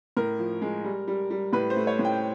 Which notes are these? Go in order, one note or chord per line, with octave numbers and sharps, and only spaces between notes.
A2 A#4
F3
G#3
G3
G3
G3
A2 B4
C5
A3
C#5
A2
G5